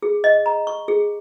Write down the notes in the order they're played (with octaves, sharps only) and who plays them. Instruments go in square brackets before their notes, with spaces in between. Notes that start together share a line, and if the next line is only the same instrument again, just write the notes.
[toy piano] G#4
D#5
A#5
C#6
G#4